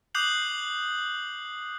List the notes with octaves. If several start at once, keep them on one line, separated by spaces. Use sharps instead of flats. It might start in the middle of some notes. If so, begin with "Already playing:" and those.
D6 D#6 F#6 G6 C7 F#7